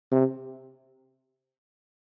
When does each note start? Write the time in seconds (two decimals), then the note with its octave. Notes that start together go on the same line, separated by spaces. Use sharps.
0.12 C3